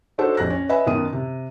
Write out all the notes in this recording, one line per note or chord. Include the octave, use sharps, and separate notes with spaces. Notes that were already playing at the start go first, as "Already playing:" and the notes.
D4 D#4 F#4 A4 C5 C#5
A#1 F2 G4 F#6 A#6
C#4
B4 C#5 D#5 E5 G#5 B5
F#2 B2 D#3 A#4 D#6 D#7
C3